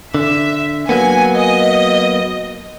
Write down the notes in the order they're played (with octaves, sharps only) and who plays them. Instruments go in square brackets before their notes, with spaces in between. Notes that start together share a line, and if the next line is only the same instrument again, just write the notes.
[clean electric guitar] D3 [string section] E5
[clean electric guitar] F#3 A#3 B3 [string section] G#5
[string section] D#5